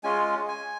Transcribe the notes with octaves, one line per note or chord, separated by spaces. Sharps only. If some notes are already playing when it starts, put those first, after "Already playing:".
G#3 C#4 F4 G#5
G#5